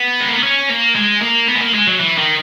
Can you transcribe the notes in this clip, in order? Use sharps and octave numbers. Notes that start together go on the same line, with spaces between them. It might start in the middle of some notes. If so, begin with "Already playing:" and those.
Already playing: B3
G#3
A#3
B3
C#4
A#3
G#3
A#3
B3
G#3
A#3
G#3
F#3
E3
D#3